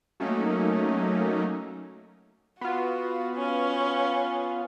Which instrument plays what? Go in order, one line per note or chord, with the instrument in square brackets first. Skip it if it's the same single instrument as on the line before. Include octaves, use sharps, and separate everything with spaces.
[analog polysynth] F#3 A3 A#3 C#4 D#4
[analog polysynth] B3 F4 [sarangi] F#4
[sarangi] C#4